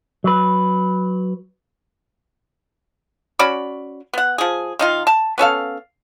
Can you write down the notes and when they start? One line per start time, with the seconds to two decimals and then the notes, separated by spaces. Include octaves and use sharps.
0.24 F#3 B4
3.39 C#4 F#4 D5 B5
4.13 B3 F#5
4.38 F3 G#4
4.79 D#3 D#4 F4
5.07 A5
5.38 B3 C#4 A4 F5